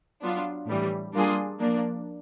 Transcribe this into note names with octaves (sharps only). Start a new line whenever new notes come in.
F#3 B3 D4 F4
A2 E3 G3
G3 A#3 D4 F4 G#4
F3 A#3 D4